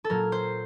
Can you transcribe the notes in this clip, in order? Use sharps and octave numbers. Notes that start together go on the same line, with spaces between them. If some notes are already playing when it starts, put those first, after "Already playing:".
A4
A#2 F#3 A#4
C5